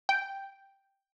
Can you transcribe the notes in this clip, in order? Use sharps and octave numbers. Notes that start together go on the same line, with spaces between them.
G5